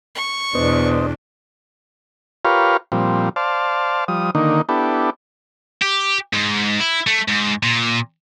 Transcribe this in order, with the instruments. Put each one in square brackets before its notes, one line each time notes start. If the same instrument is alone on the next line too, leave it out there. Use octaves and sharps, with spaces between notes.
[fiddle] C#6
[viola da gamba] E2 B2 D4 [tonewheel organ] B3 C5 D#5
[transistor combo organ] F4 G4 A#4 B4 C#5 F5
A#2 F3 G3 C4
C5 D5 F5 A5
F3 G3 D#6
D3 D#3 A#3 D#4
B3 D4 E4 G4 A4
[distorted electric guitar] G4
G#2
E4
A3
G#2
A#2